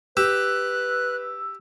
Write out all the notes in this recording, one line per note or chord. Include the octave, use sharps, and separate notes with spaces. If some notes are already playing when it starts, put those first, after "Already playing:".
G4 B4 E6 F#6